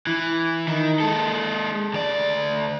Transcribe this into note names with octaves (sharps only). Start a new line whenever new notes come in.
E3
D#3
G#3 A4
D2 D5